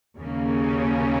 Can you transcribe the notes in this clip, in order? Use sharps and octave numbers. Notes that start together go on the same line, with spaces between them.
D#2 C#3 A#3 C#4